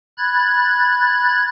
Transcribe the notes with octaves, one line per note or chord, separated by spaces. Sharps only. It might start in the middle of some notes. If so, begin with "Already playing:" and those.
B5 F#6 G#6 A6